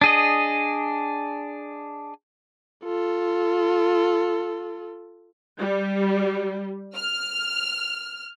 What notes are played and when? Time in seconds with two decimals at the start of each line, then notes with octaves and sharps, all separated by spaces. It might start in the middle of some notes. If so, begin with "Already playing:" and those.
0.02 D4 G#4 D#5
2.85 F4 A4
5.58 G3
6.96 F6